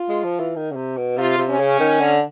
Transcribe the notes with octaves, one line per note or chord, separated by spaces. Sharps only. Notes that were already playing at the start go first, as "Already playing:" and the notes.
Already playing: F4
G#3
F3
E3
D#3
C#3
C3
B2
C3 F4
C3
C#4
C#3
D#3
D3